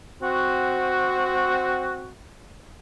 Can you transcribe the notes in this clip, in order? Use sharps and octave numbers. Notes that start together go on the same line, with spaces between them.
C4 F#4